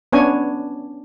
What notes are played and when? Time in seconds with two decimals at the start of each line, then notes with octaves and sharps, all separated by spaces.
0.13 B3 C#4 D4 C#5 G#5